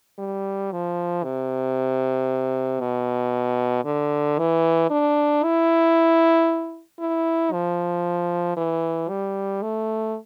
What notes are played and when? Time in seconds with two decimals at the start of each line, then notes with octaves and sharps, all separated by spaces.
0.19 G3
0.72 F3
1.24 C3
2.80 B2
3.85 D3
4.38 E3
4.90 D4
5.43 E4
7.00 E4
7.52 F3
8.57 E3
9.09 G3
9.62 A3